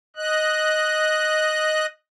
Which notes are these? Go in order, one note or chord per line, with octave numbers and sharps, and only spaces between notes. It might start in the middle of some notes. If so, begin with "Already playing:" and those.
D#5 F#6